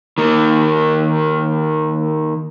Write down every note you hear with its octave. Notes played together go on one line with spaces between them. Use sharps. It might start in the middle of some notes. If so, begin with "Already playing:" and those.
D#3 A#3